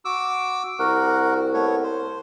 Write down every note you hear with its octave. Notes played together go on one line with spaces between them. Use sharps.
F#4 D6 E6
C2 F#4 A#4 F#5
A3 B3 C#5
C5